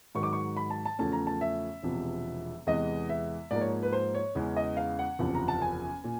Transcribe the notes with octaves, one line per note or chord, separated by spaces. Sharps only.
G#2 D#3 F#3 C#6
D6
C#6
B5
A5
A5
E2 C#3 F3 A3 C#4 A5
A#5
A5
E5
E1 E2 C3 F3
E2 C3 E3 G#3 D#5
E5
G#2 F3 A#3 D5
C#5
B4
C5
C#5
E2 C#3 E3 G#3 C#4
D#5
F5
F#5
F#1 E2 C3 F3
A#5
A5
G#5
A#2